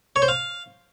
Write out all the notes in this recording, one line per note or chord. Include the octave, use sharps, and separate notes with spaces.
C#5
C5
F5